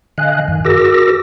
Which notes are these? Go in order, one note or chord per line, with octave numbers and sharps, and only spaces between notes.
D3 D#5 F5 G#5 F#6
F#2 D#3
F#4 G#4 A#4 D6 E6 A#6